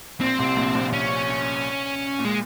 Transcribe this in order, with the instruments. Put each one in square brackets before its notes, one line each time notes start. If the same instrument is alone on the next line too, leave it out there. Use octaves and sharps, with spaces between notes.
[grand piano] A#1 A#2 [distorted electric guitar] C4
[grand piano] C2 C3
A#1 A#2
A#1 A#2
[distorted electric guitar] C#4
[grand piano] A#2
[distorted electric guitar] G#3